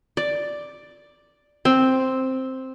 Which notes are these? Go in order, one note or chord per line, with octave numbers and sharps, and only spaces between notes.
D5
C4